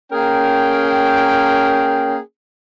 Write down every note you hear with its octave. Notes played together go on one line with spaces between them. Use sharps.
A#3 C#4 G#4 A#4 G5